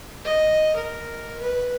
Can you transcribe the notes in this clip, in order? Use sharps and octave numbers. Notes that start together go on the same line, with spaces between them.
D#5
A#4
B4